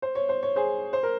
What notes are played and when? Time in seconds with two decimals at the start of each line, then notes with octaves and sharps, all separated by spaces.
0.02 C5
0.15 C#5
0.29 C5
0.43 C#5
0.56 G#4 C5
0.93 C5
1.03 A#4